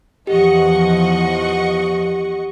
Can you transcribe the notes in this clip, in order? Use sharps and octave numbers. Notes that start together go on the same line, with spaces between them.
E2 F3 G4 D#5 F#5 C#6